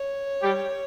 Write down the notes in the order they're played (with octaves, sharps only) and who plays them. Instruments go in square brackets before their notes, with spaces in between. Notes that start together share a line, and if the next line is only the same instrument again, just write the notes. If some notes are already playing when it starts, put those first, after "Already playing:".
Already playing: [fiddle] C#5
[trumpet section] G3 G4